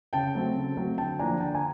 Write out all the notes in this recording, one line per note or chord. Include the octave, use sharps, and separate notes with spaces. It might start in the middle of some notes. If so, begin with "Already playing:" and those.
C#3 G5 A5
F#3 A3 C4
C#3
F#3 A3 C4
D3 G5 A5
F3 A#3 D4 G#5 A#5
D3 G5 A5
G#5 A#5